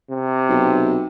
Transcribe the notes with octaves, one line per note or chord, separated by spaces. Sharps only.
C3
B1